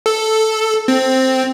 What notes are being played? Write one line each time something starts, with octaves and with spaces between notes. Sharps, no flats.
A4
C4